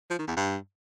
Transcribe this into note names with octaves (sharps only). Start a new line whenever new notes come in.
F3
D#3
E2
G2